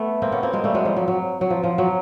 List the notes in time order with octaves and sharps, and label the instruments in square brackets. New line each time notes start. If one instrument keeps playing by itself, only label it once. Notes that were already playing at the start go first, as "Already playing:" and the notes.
Already playing: [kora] A3 B3
A#3 C4
B3 C#4
A#3 C4
G#3 A#3
G3 A3
F#3 G#3
F3 G3
F#3
F#3
F#3
F3
F3
F#3